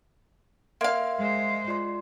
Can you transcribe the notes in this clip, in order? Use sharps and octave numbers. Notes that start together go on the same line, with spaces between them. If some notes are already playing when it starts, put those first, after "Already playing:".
A#3 E5 F5 C6 G#6
G#3 C5
F4 D5 C6